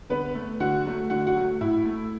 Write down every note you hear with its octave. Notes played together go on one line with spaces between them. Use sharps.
D3 B3 B4
A3
D3 F#4 F#5
F#3 A3
D3 F#4 F#5
F#4 F#5
F#3 A3
A2 E4
A3